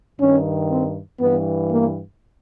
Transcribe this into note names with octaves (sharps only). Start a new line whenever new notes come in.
G2 D#3 C#4
C4
G2 E3 B3
A#3